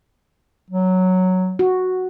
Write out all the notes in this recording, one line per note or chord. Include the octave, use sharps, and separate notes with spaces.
F#3
F#4